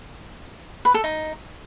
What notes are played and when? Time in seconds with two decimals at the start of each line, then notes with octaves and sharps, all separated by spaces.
0.85 B4
0.94 A4
1.04 D#4